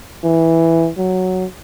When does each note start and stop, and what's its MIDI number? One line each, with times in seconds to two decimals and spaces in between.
0.24 0.89 52
0.98 1.45 54